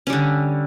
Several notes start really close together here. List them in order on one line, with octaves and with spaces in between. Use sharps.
C#4 G3 D3